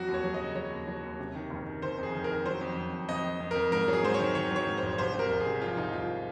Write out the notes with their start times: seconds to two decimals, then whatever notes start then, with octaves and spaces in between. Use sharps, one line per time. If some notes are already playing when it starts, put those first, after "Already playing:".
Already playing: F2 F#3 F#4
0.08 D#2
0.14 C#5
0.24 F#3
0.34 D#5
0.40 C#3
0.55 F#3 C#5
0.71 D#2
0.87 F#3
1.03 D#2
1.19 C3
1.35 D#3
1.50 F#1
1.66 D#3
1.82 D#3 C5
1.98 F2 G#4
2.14 D#3
2.24 A#4
2.30 D#3
2.45 F#3 C5
2.61 F2
2.77 F2
2.93 F2
3.09 F2 D#5
3.24 F2
3.40 F2
3.51 F2 A#4
3.72 G#2 A#4
3.88 F#3
3.93 G#4
4.03 G#2 C5
4.14 D#3 C#5
4.35 D#3 C#5
4.51 F#3
4.56 C#5
4.67 G#2
4.77 G#1 C5
4.98 C2 C5
5.14 C3 A#4
5.30 C2
5.40 G#4
5.46 C3
5.62 F3 F4
5.77 C2 D#4
5.93 C2 F4